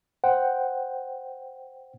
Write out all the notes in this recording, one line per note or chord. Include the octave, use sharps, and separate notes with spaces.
C5 F#5 G5